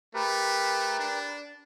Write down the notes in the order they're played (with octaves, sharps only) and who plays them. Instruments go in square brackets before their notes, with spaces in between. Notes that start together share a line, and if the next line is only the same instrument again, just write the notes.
[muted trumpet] A3 [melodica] G4 A#4 B4
[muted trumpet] D4